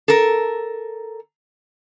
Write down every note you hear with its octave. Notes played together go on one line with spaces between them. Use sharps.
A4 A#4